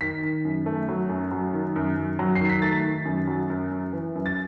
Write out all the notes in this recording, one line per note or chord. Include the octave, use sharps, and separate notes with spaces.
D#3 B6
D#3
F#2
A3
F#3
F#2
F#3
D#3
F#2
F#2
F#3
C7
D#3
B6
A3 A6
D#3
F#2
F#3
F#2
F#2
E3
F#2
A6